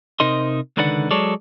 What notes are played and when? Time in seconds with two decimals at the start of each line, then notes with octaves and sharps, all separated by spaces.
0.20 C3 D#4 A#4 C5 D#5 C6
0.77 C#2 D3 D#3 B4 D5 F#5
1.11 F#3 G#3 A4 C#5 D5